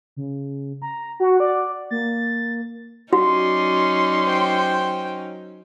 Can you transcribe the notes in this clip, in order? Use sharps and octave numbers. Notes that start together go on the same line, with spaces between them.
C#3
A#5
F#4 F#5
D5
A#3 A6
F#3 C#4 D#4 F#4 D5 C6
C5 G5